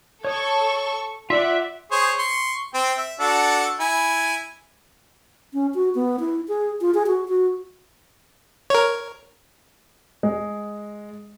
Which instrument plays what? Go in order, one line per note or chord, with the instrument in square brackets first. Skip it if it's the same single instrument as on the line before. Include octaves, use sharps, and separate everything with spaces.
[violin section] A4 C#6 [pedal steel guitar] C#5 D#6
[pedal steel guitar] F4 F#5 [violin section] D5 [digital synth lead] E5
[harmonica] G#4 C5 C#5
C6 C#6
C4 G5
E5
D4 F#4 A4
E4 G#5
[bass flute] C#4
F#4
B3
E4
G#4
F4
G#4
F#4
F#4
[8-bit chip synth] A#4 C#5
[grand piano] G#3